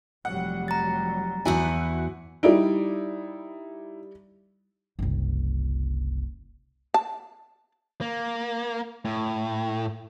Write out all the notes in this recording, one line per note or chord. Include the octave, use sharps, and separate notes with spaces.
F1 F#3 G3 F#5
A#5 A6
E2 E4 F#4 F#5 G#5
G3 D#4 E4 D5 D7
F#1 C2
A5
A#3
A2